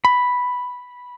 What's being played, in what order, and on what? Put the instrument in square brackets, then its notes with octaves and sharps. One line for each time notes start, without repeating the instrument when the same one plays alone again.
[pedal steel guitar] B5